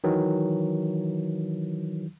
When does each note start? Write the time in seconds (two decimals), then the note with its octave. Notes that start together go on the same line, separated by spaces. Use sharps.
0.04 D#3 E3 F#3